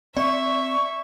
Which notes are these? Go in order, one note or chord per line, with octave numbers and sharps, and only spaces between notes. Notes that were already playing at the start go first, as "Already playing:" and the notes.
C4 D5 E5 C#6